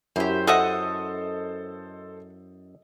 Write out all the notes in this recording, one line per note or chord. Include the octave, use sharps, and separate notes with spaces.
F#2 E4 G4 C5
F#4 A4 C5 D#5 E5 F#5